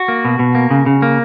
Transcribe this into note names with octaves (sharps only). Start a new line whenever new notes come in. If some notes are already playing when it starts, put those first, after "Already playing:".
Already playing: F#4
A#3
B2
B2
A#3
C#3
C#3
A#3